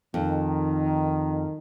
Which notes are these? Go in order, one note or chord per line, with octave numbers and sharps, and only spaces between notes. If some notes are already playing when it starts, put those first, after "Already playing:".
F2 D#3